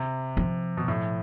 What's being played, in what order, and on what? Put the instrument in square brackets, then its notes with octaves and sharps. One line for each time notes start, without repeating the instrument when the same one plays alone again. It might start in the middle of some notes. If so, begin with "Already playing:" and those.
Already playing: [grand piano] C3
[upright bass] F3
[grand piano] B2
A2